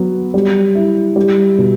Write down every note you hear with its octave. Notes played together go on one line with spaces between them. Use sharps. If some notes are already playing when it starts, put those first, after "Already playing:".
Already playing: F#3 B3
G3
E4
G3
B2